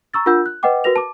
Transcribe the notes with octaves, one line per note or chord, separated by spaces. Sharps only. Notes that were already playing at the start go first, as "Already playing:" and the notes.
A#5 C#6 E6 A6
D4 F4 A#4 F#5 E6 G6
F#6
B4 D#5 F#5 G5 D6
F#4 A#4 B4 A#6 F7
A5 D6